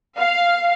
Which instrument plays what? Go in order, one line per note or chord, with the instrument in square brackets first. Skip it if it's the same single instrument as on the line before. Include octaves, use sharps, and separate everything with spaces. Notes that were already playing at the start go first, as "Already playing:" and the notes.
[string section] F5